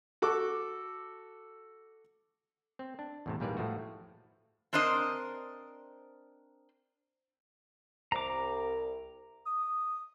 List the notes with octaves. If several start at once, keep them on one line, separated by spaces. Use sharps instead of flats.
F#4 A4 D6
C4
D4
E2 A2 C3
A#1 G#2 G3 A#3 B4 D5
A2 F3 A3 F#4
C4 D4 A#4 C5 D#5
C2 A#5 D6
D#6